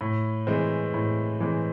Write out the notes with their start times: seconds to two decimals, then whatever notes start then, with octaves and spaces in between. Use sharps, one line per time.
0.01 A2
0.47 E3 G#3 C4
0.94 A2
1.40 E3 G#3 C4